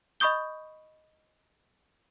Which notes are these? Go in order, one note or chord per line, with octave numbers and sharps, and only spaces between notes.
D#5 B5 C#6 D#6 G6 G7